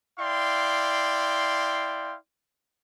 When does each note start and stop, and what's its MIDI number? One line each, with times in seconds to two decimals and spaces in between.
0.20 2.15 64
0.20 2.15 74
0.20 2.15 77
0.20 2.15 79
0.20 2.15 84